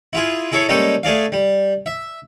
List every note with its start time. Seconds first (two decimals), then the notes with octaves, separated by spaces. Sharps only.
0.13 E4 F4 G#4
0.52 E4 G#4 A4 C#5
0.69 G3 G#3 A#3 C#4 A4 G5
1.03 A3 G#4 D5 F5
1.32 G3
1.86 E5